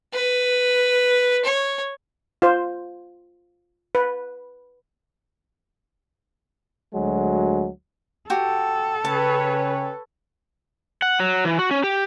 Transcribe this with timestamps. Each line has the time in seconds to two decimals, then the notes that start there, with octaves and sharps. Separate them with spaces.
0.13 B4
1.44 C#5
2.42 F4 C5
3.95 B4
6.93 D2 F#3 G#3
8.30 F#4 G4 A4
9.05 C#3 C#4 B4 C#5 G5 A5
11.02 F#5
11.20 F#3
11.45 E3
11.59 F#4
11.71 C#4
11.83 G4